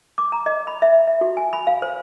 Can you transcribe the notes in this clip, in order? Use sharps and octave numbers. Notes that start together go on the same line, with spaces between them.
D6
A#5
D#5
B5
E5
E5
F#4
G#5
B5
F5
C5